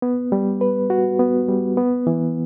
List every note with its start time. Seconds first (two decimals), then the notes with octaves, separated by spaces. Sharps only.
0.02 B3
0.32 G3
0.61 B4
0.90 F#4
1.19 B3
1.48 G3
1.77 B3
2.07 E3